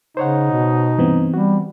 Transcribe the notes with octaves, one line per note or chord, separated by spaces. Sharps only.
C#3 D#4 C5 C#5 F#5
B2
G2 C3 E3 B3 C4
G3 F#4